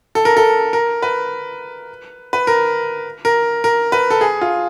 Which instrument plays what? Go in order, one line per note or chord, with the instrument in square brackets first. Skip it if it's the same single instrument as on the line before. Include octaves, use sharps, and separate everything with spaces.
[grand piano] A4
A#4
A4
A#4
B4
B4
A#4
A#4
A#4
B4
A4
G#4
F4